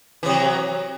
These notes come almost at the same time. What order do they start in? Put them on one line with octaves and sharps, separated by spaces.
E3 C3 F#3